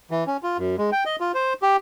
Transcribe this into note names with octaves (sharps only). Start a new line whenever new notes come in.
E3
C#4
F4
F#2
G#3
G5
D#5
F4
C5
G4